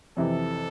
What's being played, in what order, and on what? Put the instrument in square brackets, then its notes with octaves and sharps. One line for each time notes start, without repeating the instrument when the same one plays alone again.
[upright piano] F2 C3 E3 [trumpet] A4